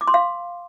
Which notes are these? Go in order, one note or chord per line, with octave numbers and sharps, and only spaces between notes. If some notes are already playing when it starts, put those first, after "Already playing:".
D6
C6
F5